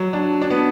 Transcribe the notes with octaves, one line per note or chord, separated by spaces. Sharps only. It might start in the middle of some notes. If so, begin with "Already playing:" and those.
Already playing: F#3
D4
D4
B3